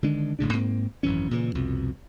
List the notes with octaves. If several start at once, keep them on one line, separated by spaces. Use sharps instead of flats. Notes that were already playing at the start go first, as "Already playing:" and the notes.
D3 D#3 G#3 D4
F#1 A2 C#3 D4
G#2 A#3 C4
G#1 F#2 E3 C#4
A#2 C#3 E3
C2 F2 B2